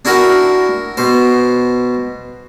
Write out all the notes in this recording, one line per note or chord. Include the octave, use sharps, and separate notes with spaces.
D4 E4 F#4 A#4 G5
B2 C5